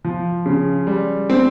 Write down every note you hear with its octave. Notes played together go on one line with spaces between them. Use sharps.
F3
C#3
G3
C4